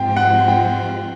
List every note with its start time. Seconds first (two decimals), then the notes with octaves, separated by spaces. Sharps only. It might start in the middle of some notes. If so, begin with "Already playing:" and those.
Already playing: G#2 F3 G#3 C4 F4 G5
0.16 F#5
0.48 G5